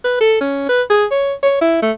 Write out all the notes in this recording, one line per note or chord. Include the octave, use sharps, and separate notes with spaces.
B4
A4
C#4
B4
G#4
C#5
C#5
E4
A3